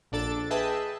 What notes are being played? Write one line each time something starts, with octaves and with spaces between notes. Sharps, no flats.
A#1 D4 A4 A6 D7
G#4 B4 D#5 E5 G5 A5